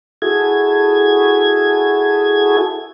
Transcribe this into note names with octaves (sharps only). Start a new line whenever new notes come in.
E4 F#4 G#4 A4 G#6